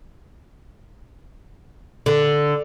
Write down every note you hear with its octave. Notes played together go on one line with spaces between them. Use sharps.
D3